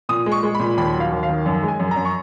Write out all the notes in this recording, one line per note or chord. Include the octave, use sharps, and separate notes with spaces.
A#2 D#6
G#3
C#6
G#3
A#2 B5
D#2 B5
F#3
F5
D#2
F5
D#3
F#2
G#3
G#5
F#2
A#5
F#2
C#6